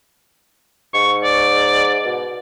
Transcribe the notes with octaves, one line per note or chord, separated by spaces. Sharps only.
G#2 C#6
D5
B2